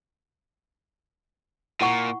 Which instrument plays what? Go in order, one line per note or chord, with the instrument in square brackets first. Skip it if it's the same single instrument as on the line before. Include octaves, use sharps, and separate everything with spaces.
[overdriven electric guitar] A#2 [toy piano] E4 F#5 C#6